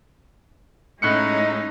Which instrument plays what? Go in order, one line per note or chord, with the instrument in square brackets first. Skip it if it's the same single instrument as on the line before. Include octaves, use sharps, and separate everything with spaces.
[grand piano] A2 F#6 C#7 [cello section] G#3 C#4 D#4